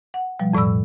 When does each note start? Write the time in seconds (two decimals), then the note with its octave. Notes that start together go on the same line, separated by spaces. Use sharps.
0.14 F#5
0.40 B2 F3 G3
0.53 F2 A2 D5 B5 E6